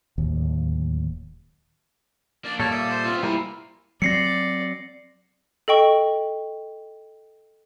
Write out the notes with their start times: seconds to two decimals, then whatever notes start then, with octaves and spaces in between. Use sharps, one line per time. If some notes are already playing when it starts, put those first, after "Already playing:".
0.18 D1 D#2
2.44 A#3 D4 D5
2.59 A#2 G3 A#3 A4 C#5 A5
2.71 D5 E5 D#6
2.91 C5
3.04 B3 C4 F4
3.23 G3 A#3 E4 A#4 C5 G#5
4.02 F#3 C4 D5 A#6 C7 C#7
5.68 A4 D#5 G5 C#6